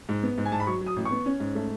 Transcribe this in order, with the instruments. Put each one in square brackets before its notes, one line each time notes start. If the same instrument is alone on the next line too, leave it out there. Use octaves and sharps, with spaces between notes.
[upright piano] G#2
B3
G#2
G#5
G#2 A5
B5
F#3 C#6
F#3
D#6
A1
C#6
B3
C#4
G#2
A3